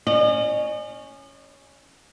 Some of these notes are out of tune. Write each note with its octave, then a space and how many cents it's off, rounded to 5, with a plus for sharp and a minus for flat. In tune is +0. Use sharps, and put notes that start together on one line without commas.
C#4 +0 D#5 -45